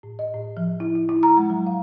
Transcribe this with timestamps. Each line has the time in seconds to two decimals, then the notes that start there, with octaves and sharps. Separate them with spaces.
0.03 A2
0.19 D#5
0.34 A2
0.57 F3
0.80 E4
0.95 E4
1.09 E4
1.23 A#5
1.37 G#3
1.50 F#3
1.67 F5